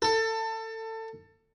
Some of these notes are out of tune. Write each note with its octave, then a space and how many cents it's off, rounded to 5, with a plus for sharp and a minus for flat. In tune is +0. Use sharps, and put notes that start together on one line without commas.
A4 +25